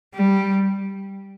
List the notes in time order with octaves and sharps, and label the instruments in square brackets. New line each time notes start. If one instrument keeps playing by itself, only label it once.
[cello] G3